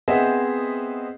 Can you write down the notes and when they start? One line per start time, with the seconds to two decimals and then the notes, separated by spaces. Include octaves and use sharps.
0.08 B3 C4 G#4 C5 D#5 E5